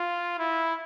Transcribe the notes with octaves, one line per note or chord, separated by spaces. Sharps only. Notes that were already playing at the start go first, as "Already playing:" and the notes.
Already playing: F4
E4